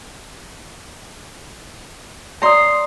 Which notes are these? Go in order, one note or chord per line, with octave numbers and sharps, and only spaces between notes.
C#5 D5 A#5 C6 D#6